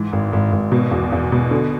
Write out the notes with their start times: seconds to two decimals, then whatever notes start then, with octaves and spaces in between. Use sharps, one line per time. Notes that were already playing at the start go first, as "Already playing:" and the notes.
Already playing: G#2 E3
0.13 G#1
0.33 G#1
0.52 G#1
0.72 B2
0.91 E2
1.12 E2
1.32 B2
1.51 D3